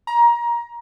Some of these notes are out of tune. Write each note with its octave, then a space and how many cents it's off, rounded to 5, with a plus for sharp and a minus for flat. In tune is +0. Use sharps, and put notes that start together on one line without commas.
A#5 +20